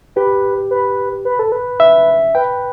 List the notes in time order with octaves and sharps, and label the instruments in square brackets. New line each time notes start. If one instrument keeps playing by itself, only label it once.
[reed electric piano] G4 [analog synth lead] B4
[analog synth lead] B4
B4
A4
B4
[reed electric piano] E5
[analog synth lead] B4 [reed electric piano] G5